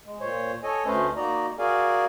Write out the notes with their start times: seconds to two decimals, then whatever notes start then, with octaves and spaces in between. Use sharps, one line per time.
0.05 G#3
0.21 A#2 C5 C#5
0.63 A4 C#5 D#5 G#5
0.86 D2 A3 C#4 B4 C5 D#5
1.16 A#3 D#4 F#4 D5 D#5 A#5
1.59 F#4 G#4 A#4 D5 F5 G#5